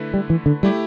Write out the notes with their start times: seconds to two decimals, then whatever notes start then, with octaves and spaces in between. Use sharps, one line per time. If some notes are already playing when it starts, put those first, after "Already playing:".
Already playing: D3 A3 E4 B4
0.14 G3
0.30 E3
0.46 D3
0.63 G3 A3 E4 G4